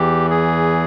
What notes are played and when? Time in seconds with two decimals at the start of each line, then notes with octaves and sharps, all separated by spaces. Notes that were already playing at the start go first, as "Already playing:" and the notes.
Already playing: E2 E3 G4
0.30 G#4